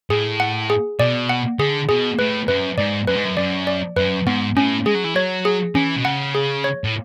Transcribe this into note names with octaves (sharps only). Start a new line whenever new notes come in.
A2 G#4
F#5
G#4
B2 D5
F#5
D3 G#4
B2 G#4
A2 B4
F#2 B4
G#2 D5
F#2 B4
G#2
F#2
F#2 D5
D5
F#2 B4
G#2 B3
A2 C#4
G#3 G#4
F#3
E3
F#3 C#5
G#4
E3 C#4
B2
C#3 F#5
G#4
C#5
A2